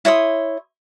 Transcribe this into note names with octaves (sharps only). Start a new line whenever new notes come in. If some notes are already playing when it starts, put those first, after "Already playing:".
E4 C#5 C6 D#6